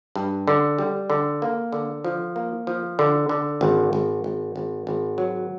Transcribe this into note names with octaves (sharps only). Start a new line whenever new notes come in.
G2
D3
G3
D3
A#3
D3
F3
A#3
F3
D3
D3
G#1
G#1
G#1
G#1
G#1
F#3